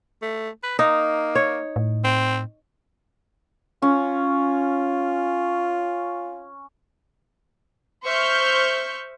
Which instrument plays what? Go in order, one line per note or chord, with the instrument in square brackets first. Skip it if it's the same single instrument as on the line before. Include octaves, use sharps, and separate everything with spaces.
[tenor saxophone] A3
B4
[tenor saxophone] A#3 [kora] D#4
[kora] C#5
[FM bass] A2
[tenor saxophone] C4
[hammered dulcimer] C#4 [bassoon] F4
[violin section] C5 E5 C#6 F6 G6